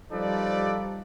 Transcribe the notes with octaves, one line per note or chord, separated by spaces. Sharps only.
F3 G3 D#4 A4 B4 D5